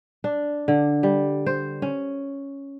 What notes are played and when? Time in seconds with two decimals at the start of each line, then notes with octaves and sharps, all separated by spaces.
0.24 D4
0.68 D3
1.03 G3
1.46 C5
1.82 C#4